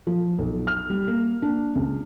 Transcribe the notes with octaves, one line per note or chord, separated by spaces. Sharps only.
F3
B1
F6
G3
A#3
D4
C#2